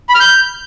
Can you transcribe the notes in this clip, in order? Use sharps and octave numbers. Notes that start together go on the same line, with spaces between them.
B5
F6
G6